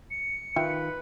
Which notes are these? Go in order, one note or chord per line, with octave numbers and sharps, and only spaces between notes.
C#7
D#3 F4 B4 E5 G5